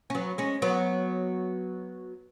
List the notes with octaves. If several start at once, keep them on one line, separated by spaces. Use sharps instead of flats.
C#4
F#3 B3
G#3 C#4
F#3 B3